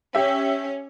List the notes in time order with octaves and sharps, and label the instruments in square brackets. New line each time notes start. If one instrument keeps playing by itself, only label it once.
[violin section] C#4 [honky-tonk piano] G4 E5